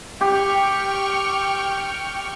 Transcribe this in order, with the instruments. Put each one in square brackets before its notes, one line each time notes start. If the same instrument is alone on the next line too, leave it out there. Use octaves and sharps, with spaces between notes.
[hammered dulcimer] G4 [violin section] G5 C#6 F6